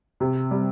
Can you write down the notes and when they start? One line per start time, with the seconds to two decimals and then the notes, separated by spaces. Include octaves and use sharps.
0.20 C3
0.51 G3